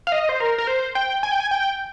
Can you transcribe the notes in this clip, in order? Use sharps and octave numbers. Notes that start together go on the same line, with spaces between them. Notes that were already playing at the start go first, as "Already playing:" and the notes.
F5
D#5
C5
A#4
A#4
C5
G5
G#5
G5
G#5
G5